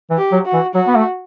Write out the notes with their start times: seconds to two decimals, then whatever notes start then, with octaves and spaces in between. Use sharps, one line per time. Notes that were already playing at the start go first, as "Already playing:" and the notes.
0.10 E3
0.18 G4
0.32 F#3
0.46 F#4
0.53 E3
0.75 F#3 F#4
0.87 B3
0.96 A3